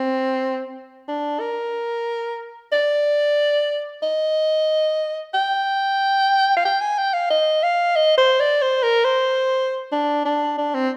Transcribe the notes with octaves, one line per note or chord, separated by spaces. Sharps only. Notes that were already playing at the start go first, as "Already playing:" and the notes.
Already playing: C4
D4
A#4
D5
D#5
G5
F5
G5
G#5
G5
F5
D#5
F5
D#5
C5
D5
C5
A#4
C5
D4
D4
D4
C4